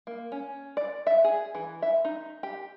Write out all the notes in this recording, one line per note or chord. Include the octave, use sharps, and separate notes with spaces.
A#3
C#4
D5
E5
G#4
E3
E5
D#4
G4